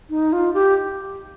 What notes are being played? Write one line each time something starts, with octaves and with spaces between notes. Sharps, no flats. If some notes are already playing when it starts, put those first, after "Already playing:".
D#4
F4
G4